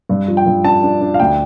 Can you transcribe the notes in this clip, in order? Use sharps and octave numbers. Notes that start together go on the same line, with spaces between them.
G2
F3
G5
G2
D4 A5
D4
D4
F5
D2 G5